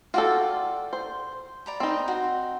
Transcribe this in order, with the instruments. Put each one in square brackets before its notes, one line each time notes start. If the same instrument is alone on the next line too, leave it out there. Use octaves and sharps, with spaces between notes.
[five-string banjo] F4 A4 [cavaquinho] F#4 D5 G5
[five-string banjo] C5
[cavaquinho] D5 A#5 B5
[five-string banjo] C4 D#4
[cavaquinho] F#4